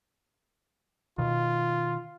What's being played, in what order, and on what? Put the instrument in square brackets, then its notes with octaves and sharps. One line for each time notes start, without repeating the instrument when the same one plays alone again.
[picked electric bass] B2 D#3 [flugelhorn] F4